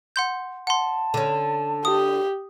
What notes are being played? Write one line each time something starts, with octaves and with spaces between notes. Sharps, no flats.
F#5 C6 G6
F#5 A5 C6
D3 C#4
G4 D#6